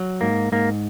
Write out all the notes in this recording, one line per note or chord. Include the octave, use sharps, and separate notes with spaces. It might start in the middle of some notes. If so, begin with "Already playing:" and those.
Already playing: F#3
G#2 A#3
G#2 A#3